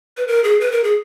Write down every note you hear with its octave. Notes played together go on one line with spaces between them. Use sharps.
B4
A#4
G#4
B4
A#4
G#4